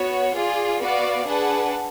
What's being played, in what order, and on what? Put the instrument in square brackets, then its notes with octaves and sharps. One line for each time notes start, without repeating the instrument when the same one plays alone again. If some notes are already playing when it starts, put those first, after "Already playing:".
Already playing: [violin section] B3 F#4 C#5
F4 G#4 D5
B3 F#4 B4 D5 F5
D4 G#4 B4 F#5 A5